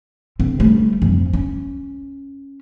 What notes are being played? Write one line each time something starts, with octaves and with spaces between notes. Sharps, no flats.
D3 C4
G3 A3
F2
C#4